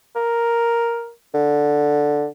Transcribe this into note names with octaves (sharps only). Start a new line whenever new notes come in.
A#4
D3